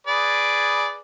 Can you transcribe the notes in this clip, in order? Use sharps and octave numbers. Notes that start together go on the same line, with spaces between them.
G#4 B4 D5